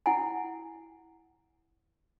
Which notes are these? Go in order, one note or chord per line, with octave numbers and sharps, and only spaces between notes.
E4 F#5 G#5